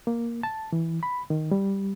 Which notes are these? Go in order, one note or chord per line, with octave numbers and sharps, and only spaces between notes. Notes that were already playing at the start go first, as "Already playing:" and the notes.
A#3
A5
E3
B5
D#3
G3